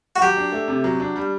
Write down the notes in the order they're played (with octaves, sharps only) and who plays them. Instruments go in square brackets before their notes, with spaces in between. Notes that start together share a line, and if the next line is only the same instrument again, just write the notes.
[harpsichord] F#4
[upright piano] F#3 [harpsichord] G4
[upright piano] D4
A3
C3
F#3
D4
G3